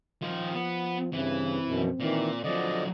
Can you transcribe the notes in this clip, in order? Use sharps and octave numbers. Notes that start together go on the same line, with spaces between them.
D#3 F3 F4
B3
G2 C#3 E3 C4
F#2 B2
A#2 D#3 E3
D3 F3 F#3 D5 D#5